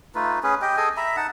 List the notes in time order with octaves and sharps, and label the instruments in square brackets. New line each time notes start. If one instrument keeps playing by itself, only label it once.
[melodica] A3 D#4 F4 B4
C#4 G#4 B4
G4 D#5 G5
G#4 A4 D#5 G#5
E5 A#5 B5
D#4 F#5 A5